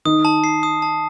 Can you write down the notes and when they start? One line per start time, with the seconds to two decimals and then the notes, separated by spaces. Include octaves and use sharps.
0.05 D#3 D#4 D#6
0.25 A5
0.44 C7
0.63 D#6
0.82 A5